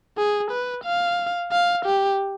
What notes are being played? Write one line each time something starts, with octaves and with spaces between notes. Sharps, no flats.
G#4
B4
F5
F5
G4